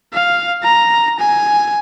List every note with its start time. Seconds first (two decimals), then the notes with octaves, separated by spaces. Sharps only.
0.13 F5
0.63 A#5
1.19 G#5